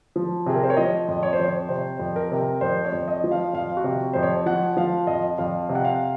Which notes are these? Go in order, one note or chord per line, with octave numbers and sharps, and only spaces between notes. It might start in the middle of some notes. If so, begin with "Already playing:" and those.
F3
C3 G#4
A#4
C5
C#5
F3 D#5
F2
C#5
C5
F2
C#5
C3 C5
F2
A#4
C3
F2 C5
C#5
F2
D#5
F3
F5
F2 F5
F#4
C3
F2 C5
C#5
F3 F#5
F3 F5
F2 D#5
F2 F5
C3
F#5
F5